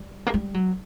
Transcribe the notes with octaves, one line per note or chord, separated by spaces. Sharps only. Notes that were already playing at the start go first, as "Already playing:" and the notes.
Already playing: G3
A#3
G3
F#3